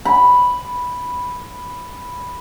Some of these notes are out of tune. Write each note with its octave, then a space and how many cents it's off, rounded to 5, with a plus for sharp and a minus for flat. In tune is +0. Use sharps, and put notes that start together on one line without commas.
B5 -5